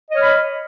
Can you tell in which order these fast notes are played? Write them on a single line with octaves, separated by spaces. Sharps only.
D#5 C#5 F6 B5